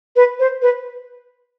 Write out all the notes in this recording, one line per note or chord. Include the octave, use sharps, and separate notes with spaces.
B4
C5
B4